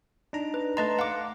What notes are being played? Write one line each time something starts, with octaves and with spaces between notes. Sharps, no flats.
D4 D#4 A#5
B4
A3 B4 D#5 A5 A#5 C6
F5 F#5 D6